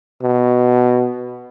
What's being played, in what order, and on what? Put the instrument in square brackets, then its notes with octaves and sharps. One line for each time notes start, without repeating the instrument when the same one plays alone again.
[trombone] B2